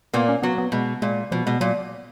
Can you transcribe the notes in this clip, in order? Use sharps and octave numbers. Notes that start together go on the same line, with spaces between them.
A#2 A#3 B3
C#4
F#3 B3
B3
B2 G#3
A#2 G#3
B2 F3
B2 G#3
A#2 F#3